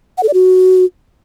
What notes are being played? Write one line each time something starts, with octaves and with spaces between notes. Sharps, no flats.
F#5
A4
D5
F#4